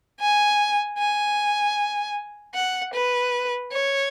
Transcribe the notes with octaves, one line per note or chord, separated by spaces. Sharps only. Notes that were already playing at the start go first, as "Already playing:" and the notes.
G#5
G#5
F#5
B4
C#5